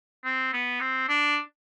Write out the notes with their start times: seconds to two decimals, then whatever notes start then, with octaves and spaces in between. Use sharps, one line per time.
0.24 C4
0.53 B3
0.80 C4
1.09 D4